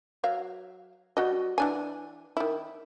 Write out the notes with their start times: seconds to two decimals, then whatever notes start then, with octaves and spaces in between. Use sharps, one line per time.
0.24 F#3 E5 F5
1.17 G3 F#4 D#5
1.58 E3 D4 G#5
2.37 D#3 E4